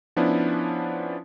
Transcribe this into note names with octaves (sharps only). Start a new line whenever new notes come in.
F3 B3 C#4 D4 E4